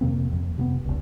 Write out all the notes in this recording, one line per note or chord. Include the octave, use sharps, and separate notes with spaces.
F2 C3 A#3 C4
F2
C3 A#3 B3
F1 C#2